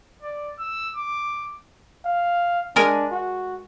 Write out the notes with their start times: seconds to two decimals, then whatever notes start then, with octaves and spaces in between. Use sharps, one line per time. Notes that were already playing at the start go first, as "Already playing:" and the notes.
0.23 D5
0.59 E6
0.96 D6
2.05 F5
2.76 G#3 D4 A#4 G#5
3.12 F#4